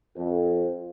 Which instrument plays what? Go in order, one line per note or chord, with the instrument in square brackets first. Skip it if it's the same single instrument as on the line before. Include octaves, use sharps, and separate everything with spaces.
[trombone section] F2